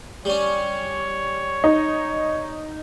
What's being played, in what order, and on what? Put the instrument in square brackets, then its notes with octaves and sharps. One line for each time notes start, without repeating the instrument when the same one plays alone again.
[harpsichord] G3 C#4 [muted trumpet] C#5
[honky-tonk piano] D#4